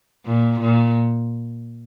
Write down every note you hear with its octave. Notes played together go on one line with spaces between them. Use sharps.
A#2
A#2